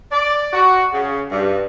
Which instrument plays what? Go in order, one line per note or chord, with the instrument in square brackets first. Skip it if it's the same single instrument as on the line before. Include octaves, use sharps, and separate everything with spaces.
[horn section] D5
F#4
C#3
G2